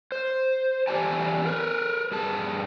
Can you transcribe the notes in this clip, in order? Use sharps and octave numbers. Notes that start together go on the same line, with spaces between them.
C5
E2 G4 D5 G#5 A5
A#4 B4
G2 G#4 A5